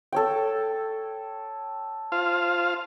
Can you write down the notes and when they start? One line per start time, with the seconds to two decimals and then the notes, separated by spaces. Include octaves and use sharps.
0.12 A4 C#5 G5
2.12 F4 C5 F5